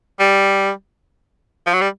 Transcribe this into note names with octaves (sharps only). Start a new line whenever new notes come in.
G3
F3
F#3
G3